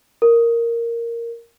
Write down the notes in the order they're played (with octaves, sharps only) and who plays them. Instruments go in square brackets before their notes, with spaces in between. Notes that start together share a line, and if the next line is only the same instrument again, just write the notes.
[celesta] A#4